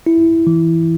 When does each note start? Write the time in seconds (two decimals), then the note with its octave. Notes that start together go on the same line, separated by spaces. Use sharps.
0.06 E4
0.47 E3